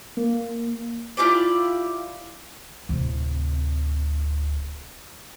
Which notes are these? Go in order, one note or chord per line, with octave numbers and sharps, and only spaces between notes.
A#3
E4 F4 G4 D5
D1 C3